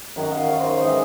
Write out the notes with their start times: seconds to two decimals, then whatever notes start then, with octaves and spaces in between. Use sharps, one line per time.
0.16 F#2 D#3 F#3 F#5
0.32 F5
0.49 C#5
0.59 C5
0.70 C#5
0.80 E3 G#3 D#5